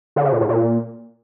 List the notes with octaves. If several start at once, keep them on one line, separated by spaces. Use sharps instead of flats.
D3
C#3
A#2
A2
A#2